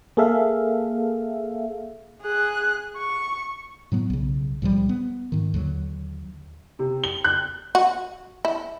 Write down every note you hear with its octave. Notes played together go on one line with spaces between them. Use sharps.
A#3 G#4 A4 E5 F5
G#4 F#6
C#6
A2 F#3 B3
B1 C#3
C#2 A#2 F3 G3
B3
G#2 D#3
D#2 D3 F#3
C3
G7
F#6
F#4
E4